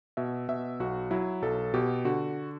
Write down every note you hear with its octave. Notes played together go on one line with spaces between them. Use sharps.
B2 E5
B2 E5
B1 F#4
F#3 E4
B1 A4
B2 G4
D3 F#4